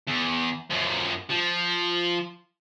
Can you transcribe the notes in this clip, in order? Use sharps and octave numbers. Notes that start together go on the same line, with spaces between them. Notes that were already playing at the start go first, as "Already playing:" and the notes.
E2
F#2 F3
F3